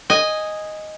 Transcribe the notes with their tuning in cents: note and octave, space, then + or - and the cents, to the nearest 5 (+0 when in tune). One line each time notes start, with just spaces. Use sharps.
D#5 +0 G#5 -10